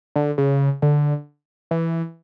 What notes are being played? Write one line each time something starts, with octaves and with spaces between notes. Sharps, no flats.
D3
C#3
D3
E3